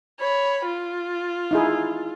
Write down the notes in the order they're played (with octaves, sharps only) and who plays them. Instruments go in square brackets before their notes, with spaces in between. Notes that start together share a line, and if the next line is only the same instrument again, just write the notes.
[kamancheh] C#5 B5
F4
[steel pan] D#4 E4 G#4